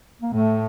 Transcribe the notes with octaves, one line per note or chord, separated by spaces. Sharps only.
A#3
A2 A3